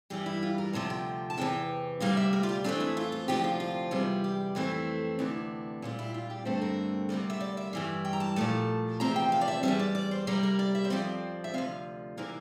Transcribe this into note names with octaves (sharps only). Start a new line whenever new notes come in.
G2 E3 G3 G4
E4
F4
A#4
D2 C3 F3 A5
G5
A5
E2 C3 E3 G5
D2 C3 G3 A#3 F5
E5
A#4
F4
G4
F2 E3 A3 C4 D4
E4
F4
F4
D2 C3 F3 C4 G4
F4
F4
E2 C3 G3
G4
F2 E3 A3 C4 E4
D2 C3 E3 D4
A#2 G3 C4
E4
F4
G4
G2 D3 A3 C4 A4
A#4
D2 C3 G3 A#3
E5
D5
E5
G2 E3 G3
G5
A#5
A5
A#2 F3 A3 A5
E2 C3 F3 C4 A#5
G5
F5
D5
E5
E2 C3 G3 E5
D5
D5
C5
C3 G3 A#3 A#4
A#4
D5
E5
C5
F2 C3 F3 C4 D5
E5
D2 C3 F3 F5
C3 E3 A#3 A#4